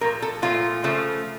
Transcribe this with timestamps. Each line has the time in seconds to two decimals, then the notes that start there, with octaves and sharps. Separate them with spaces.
0.01 A#2 F3 A3 A#4
0.22 A4
0.42 A#2 F3 A3 F4
0.84 C#3 F3 A3